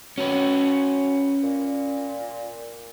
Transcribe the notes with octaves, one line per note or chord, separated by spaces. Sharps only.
F#3 C#4 B4
A#2